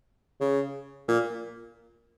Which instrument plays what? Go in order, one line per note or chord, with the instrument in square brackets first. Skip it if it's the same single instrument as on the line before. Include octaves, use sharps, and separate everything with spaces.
[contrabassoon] C#3
A#2